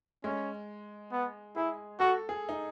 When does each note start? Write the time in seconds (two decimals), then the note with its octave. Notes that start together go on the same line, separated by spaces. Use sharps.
0.24 G#3 C#4
1.12 B3
1.56 E4 G#4
2.00 F#4 A4
2.29 G#4
2.49 D#4